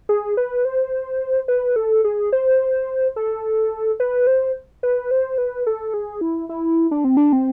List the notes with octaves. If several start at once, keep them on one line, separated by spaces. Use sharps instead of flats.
G#4
B4
C5
B4
A4
G#4
C5
A4
B4
C5
B4
C5
B4
A4
G#4
E4
E4
D4
C4
D4
C4